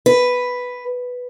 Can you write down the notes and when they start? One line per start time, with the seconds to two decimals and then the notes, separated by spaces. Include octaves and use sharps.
0.06 B4